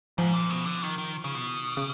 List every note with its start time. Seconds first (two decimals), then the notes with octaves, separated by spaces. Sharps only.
0.18 G#2 F3
0.34 A#2
0.50 B2
0.66 D3
0.82 D#3
0.98 D#3
1.24 C#3
1.35 B2
1.46 E3
1.62 D#3
1.77 C#3